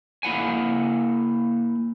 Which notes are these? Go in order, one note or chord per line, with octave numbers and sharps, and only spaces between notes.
A#3 E4 F#5 G#5